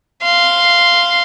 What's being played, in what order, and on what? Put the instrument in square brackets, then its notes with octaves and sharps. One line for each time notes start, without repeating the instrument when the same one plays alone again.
[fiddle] F5 C6